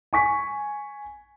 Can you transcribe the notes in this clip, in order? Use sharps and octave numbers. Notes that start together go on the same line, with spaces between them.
G#5 C#6 B6